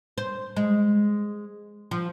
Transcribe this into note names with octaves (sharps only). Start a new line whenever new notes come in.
C5
G#3
F3